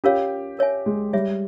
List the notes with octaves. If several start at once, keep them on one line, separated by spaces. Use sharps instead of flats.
C#4 F4 G4 A#4 C#5 F5
A#4 C#5 E5 G#5
G#3
G3 G#4 C#5 E5